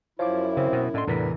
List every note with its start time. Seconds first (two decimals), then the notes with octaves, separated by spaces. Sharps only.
0.19 F#2 F3 E4 C#5 F5 D6
0.57 C#3 C4
0.72 B2
0.94 A2 D3 C#4 D#5 C6
1.07 E2 A2 C3 E3 A#4 B4 B6